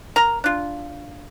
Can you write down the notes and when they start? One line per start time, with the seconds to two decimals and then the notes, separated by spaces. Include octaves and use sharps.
0.16 A#4 A#5
0.44 D4 F4